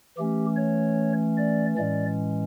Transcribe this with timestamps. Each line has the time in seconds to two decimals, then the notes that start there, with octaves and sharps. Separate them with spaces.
0.17 E3 A3 C#4 G4
0.57 C#5
1.38 D5
1.78 A2 E3 G#3 C#4 D5